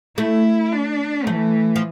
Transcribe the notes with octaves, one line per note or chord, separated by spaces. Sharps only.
A3 E4
D4
E3 A3
F3